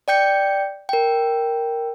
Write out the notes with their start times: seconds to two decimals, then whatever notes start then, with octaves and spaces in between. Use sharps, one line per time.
0.08 D5 G5 G6 C#7
0.89 A#4 G5